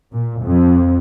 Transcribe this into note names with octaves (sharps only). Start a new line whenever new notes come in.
A#2
F2